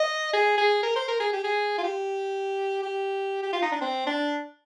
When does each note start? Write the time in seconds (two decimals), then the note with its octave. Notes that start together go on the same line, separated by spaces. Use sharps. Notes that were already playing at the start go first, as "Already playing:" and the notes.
Already playing: D#5
0.33 G#4
0.58 G#4
0.83 A#4
0.96 C5
1.08 A#4
1.20 G#4
1.33 G4
1.44 G#4
1.78 F4
1.83 G4
2.82 G4
3.43 G4
3.52 F4
3.62 D#4
3.72 D4
3.81 C4
4.06 D4